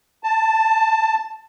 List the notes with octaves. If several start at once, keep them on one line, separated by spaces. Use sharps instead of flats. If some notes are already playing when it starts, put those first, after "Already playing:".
A5